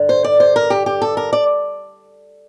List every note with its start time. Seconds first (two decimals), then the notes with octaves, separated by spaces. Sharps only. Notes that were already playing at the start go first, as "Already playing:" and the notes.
Already playing: G2 D3
0.09 C5
0.24 D5
0.40 C5
0.56 A#4
0.70 G4
0.86 G4
1.02 A4
1.17 A#4
1.33 D5